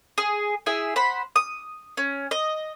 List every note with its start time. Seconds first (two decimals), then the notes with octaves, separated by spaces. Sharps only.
0.18 G#4
0.66 E4 G#4 E5
0.96 C5 F#5 B5
1.36 D#6
1.97 C#4
2.31 D#5